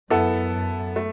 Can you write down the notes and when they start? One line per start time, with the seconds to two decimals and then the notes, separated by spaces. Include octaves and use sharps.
0.10 F#2 B3 E4 A4
0.53 F#2
0.96 A3